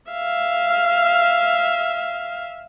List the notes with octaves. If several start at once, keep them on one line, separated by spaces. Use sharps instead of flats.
E5 F5